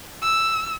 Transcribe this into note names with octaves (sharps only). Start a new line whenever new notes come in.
E6